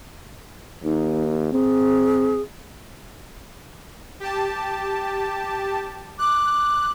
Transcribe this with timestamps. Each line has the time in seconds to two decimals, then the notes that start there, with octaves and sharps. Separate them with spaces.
0.84 D#2 D#4
1.52 C4 G#4
4.20 G4 A5
6.19 D6 F#6